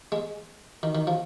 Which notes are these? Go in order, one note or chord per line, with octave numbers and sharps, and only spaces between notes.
G#3
D#3
D#3
F3